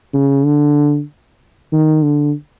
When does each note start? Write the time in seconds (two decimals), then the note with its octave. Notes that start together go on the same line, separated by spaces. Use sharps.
0.14 C#3
0.45 D3
1.72 D#3
2.04 D3